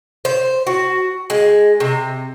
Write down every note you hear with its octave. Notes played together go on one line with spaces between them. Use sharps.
C5
F#4
G#3
C3